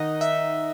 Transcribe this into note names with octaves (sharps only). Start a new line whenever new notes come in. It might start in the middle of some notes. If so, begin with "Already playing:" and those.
Already playing: D#3 D#4 D#5 F#5
E5